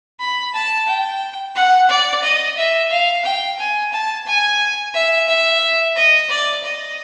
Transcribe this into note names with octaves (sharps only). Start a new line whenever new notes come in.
B5
A5
G5
F#5
D5
D#5
E5
F5
G5
G#5
A5
G#5
E5
E5
D#5
D5
D#5